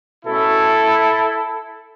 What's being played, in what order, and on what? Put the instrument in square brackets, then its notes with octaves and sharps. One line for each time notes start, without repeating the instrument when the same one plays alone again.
[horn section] B2 A3 C#4 E4 A4